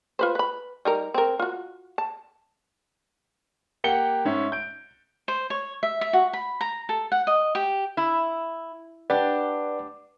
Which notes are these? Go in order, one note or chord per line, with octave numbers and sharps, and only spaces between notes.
F4 B4 C5
B4 B5
G3 D#4 A#4
C4 A#4
F4 F#4
A5
A#3 G4 F#5 C#7 G7
G#2 C#4 E5
G6 D7
C5
C#5
E5
E5
F#4
B5
A#5
A4
F#5
D#5
G4
E4
D4 G4 B4 D5 F#5